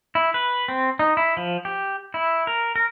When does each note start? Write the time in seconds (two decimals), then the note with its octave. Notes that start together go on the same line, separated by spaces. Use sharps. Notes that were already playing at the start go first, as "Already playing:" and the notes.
0.15 E4
0.34 B4
0.68 C4
0.99 D#4
1.17 E4
1.37 F3
1.65 G4
2.14 E4
2.47 A#4
2.76 A#4